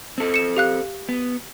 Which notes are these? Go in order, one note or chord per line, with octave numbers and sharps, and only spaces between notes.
C4 A4
C#7 E7
G4 F5 F#6
B3